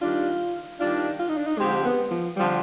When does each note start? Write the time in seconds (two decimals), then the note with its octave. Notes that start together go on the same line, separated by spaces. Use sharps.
0.02 D#3 G3 D4 F4
0.80 D#3 G3 D4 F4
1.20 F4
1.29 D#4
1.38 D4
1.47 D#4
1.58 D3 F3 G#3 C4 G4
1.85 B3
2.11 F3
2.37 D3 F3 G3 C4 G4